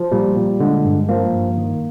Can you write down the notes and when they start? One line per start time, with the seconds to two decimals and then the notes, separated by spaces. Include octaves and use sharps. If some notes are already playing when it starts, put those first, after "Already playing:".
Already playing: F3
0.12 A#2 G3
0.36 A#2
0.60 D3 G#3
0.85 G2
1.09 F3 A#3
1.33 G2
1.58 D#3